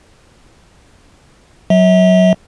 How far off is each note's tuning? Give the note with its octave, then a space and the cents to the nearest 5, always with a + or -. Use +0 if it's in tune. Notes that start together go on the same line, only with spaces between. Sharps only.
F#3 +0 E5 -35